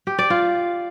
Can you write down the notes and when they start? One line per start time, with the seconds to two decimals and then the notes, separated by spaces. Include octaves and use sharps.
0.07 G4
0.19 D5
0.30 F4